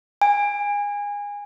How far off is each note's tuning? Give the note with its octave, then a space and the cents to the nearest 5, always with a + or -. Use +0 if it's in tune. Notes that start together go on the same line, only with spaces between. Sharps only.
G#5 -25